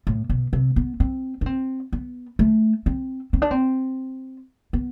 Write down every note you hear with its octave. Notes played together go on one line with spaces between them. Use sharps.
A2
B2
C3
B3
C4
D4
C4
B3
A3
C4
C4
D4
C4
B3